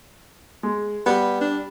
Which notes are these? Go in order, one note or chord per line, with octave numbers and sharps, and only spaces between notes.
G#3
G3 B3
D4